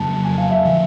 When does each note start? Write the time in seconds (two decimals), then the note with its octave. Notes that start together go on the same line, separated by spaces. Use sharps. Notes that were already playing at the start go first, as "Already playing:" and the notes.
Already playing: F2 C#3 F#3 A#3 A5
0.25 G#5
0.38 F5
0.51 E5
0.65 D3 F3 E5